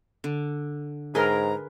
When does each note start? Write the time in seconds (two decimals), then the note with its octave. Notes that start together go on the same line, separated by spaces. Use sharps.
0.24 D3
1.15 G#2 G#4 A#4 B4 G#5 A#5 C6